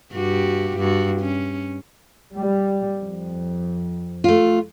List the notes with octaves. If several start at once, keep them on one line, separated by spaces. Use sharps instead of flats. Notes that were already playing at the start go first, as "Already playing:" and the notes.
G2 F#4 G4
G2 F#4
C#4
G3
F2
A3 F4